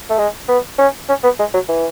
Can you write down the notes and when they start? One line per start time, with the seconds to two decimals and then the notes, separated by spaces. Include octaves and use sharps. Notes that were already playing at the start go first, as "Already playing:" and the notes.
0.10 A3
0.18 G#3
0.48 B3
0.78 C#4
1.09 C#4
1.24 B3
1.39 G#3
1.54 F#3
1.69 E3